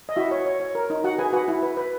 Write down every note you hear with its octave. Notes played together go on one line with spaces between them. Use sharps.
D#5
E4 F#4 E5
C#5
C#5
C#5
A#4
D#4
F#4 F#5
G#4 B4 G#5
F#4 B4 F#5
E4
B4
B4